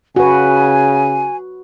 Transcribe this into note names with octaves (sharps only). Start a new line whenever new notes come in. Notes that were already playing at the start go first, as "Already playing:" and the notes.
C#3 F#4 B4 G#5